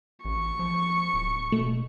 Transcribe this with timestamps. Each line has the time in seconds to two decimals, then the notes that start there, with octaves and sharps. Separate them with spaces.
0.25 A1 C#6
0.59 F3
1.14 D1
1.52 B2 A3